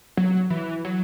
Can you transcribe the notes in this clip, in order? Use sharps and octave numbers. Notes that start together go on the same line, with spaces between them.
F#3
E3
F#3